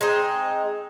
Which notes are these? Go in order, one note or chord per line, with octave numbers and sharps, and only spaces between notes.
G#3 C4 D#4